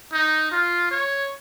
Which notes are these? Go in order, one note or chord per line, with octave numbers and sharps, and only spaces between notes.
D#4
F4
C#5